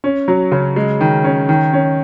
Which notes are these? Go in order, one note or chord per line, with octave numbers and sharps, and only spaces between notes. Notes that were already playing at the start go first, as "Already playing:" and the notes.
C#4
F#3
C#3
G#3
D#3
C#4
D#3
C#4